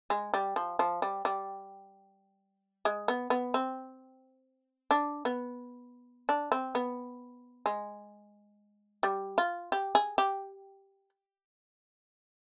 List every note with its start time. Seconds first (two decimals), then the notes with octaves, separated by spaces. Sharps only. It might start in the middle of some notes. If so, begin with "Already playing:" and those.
0.10 G#3
0.34 G3
0.56 F3
0.79 F3
1.02 G3
1.25 G3
2.85 G#3
3.08 B3
3.30 B3
3.54 C4
4.91 D4
5.25 B3
6.29 D4
6.52 C4
6.75 B3
7.66 G#3
9.03 G3
9.38 F4
9.72 G4
9.95 G#4
10.18 G4